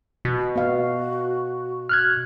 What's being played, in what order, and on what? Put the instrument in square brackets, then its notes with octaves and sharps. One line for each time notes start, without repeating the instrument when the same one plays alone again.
[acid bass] B2
[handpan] B3 F5 [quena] F#4
[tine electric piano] F6 F#6 G#6